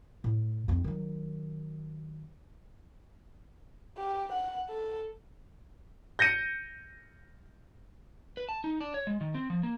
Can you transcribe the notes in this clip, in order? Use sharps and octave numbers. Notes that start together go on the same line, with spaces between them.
A2
F2 C4
D#3 F#3
G4
F#5
A4
G6 A#6 C#7 D#7
B4
A5
D#4
D4
C#5
G#3
D#3
C4
F3
A#3